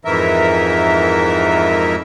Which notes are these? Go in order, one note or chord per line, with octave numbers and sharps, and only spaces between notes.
F2 G#2 E3 A#4 E5